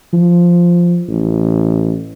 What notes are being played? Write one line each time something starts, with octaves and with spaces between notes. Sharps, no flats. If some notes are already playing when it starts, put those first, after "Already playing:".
F3
A1